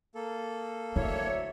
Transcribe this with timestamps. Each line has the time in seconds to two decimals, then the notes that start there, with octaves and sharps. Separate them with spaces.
0.15 A#3 A4
0.96 D2 F#3 E4 C#5 D5 E5